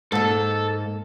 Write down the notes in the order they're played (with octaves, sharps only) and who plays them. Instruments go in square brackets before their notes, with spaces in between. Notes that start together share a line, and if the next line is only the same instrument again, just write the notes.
[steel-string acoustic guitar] G#2 A#3 [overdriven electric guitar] A4 A5